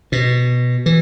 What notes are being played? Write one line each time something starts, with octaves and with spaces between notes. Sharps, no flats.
B2
E3